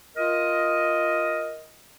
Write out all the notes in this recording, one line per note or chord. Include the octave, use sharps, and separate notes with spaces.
F4 A#4 D#5